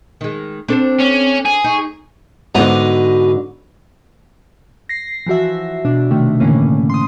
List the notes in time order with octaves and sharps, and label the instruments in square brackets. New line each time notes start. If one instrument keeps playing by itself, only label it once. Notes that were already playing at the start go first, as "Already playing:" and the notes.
[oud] D#3 G#3
[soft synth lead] C4 [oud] D4 A4 C5
[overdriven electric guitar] C#4
G#4
[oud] D#4 [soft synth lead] C#6
[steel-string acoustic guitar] G#2 D3 [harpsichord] B3 D#5 A#5 [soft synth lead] F#4
[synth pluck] A#6 C7
E3 F3 F#4 E5
B2 D4
C3 D#3 A3
A2 D3 E3 A3 A#3 C#4
C6 D#6